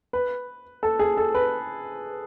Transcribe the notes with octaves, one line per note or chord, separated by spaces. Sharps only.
B4
A4
G#4
A4
B4